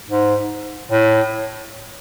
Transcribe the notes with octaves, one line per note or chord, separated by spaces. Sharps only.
G#2
A2